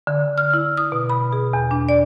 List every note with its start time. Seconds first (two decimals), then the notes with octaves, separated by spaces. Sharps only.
0.07 D3
0.38 F6
0.54 E4
0.77 D#6
0.92 B2
1.10 B5
1.33 G#4
1.53 E2
1.71 D4
1.89 D5